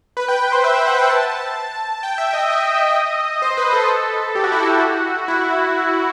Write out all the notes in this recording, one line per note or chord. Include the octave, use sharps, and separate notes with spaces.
B4
G5
G5
C5
E5
E5
F#5
G5
A5
G5
E5
D#5
D#5
C5
B4
A4
G4
F#4
E4
F#4
E4